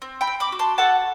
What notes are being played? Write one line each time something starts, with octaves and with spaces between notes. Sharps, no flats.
C4
G5 B5
C4
B5 D6
F#4
A5 C6
A4 F#5 A5